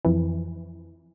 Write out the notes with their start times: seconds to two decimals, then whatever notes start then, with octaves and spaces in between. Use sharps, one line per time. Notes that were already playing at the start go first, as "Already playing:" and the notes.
0.05 F2 E3